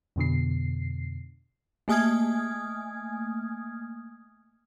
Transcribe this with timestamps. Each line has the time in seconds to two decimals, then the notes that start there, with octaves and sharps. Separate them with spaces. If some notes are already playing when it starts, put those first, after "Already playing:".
0.16 F2 B2 D3 C7
1.88 A3 A#3 G#5 D#6 F6 G#6